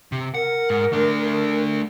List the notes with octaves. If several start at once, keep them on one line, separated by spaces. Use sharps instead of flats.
C3
A#4 F#5
G#2
A3 D4